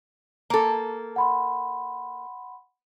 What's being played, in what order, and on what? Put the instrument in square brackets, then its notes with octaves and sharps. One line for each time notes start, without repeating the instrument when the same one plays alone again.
[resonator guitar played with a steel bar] A#3 A4
[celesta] F#5 B5 C6